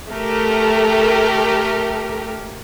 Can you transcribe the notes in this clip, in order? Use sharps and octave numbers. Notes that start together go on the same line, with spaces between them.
A3 G4 A#4